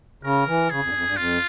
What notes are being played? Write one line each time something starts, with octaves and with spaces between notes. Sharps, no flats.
C#3 A#4
E3
C#3 G#4
F2
G2
F2
G2
F2 F4